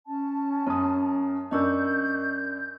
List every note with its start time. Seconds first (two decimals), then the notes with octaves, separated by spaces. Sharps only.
0.07 C#4 A5
0.67 F#2 C#5 A#5 D#6
1.51 F#2 D4 A#4 D#5 C#6 E6 G6